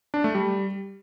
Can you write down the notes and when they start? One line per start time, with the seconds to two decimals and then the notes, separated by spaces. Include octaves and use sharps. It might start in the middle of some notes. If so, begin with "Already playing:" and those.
0.14 D4
0.24 A3
0.35 G3